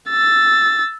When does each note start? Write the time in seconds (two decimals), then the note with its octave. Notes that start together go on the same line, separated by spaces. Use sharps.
0.10 E6 A6